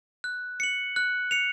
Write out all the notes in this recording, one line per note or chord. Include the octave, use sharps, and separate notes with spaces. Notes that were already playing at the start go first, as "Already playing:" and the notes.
F#6
C#7 F#7
F#6
C#7 F7